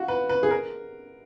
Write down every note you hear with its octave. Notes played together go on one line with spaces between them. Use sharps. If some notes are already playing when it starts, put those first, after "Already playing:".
Already playing: F4 F#4
B4
B4
G#4
A#4